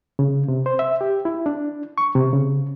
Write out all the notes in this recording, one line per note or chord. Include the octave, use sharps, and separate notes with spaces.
C#3
C3
C5
E5
G4
E4
D4
C#6
C3
C#3